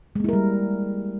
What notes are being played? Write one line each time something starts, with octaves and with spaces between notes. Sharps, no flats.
G3 G#3 A#3 E4 A#4